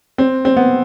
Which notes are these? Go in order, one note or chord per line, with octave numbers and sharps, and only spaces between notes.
C4
C4
B3